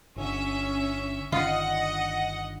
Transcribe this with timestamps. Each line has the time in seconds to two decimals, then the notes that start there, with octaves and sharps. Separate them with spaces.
0.16 G1 D3 C#4 E5
1.32 G1 D3 D#3 F4 D#5 F#5